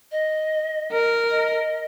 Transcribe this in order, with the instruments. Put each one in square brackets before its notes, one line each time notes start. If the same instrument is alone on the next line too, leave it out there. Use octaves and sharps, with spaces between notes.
[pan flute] D#5
[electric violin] A#4
[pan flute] D#5